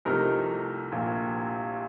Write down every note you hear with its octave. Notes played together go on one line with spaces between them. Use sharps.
C2 C3 F3 A3 D#4 A#4
A#1 A#2